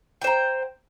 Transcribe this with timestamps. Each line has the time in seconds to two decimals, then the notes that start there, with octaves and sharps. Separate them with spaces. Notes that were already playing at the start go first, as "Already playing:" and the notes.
0.22 G5
0.24 C5
0.27 A#5